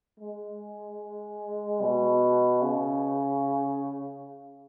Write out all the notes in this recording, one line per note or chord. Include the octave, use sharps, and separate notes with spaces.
G#3
B2
C#3